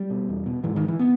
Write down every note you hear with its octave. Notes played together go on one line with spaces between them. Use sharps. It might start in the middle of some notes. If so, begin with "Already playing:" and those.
Already playing: G3
B2
E2
B2
G#2 E3
D#3
E3
B3